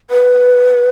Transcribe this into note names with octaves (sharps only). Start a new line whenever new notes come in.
B4